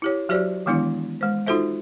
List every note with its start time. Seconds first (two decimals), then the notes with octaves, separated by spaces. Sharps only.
0.02 E4 G4 C#5
0.29 F#3 F#4 G4 C5 D5
0.66 D#3 E3 G#3 B3 D4 E4
1.21 G#3 C5
1.46 D#4 F4 F#4 A4 C5 E5